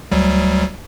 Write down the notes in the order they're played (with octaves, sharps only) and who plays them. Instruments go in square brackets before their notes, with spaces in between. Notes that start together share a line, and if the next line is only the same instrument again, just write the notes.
[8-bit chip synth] D2 F#3 G3